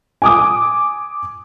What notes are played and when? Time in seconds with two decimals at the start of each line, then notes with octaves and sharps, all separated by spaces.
0.22 G#5 D6 D#6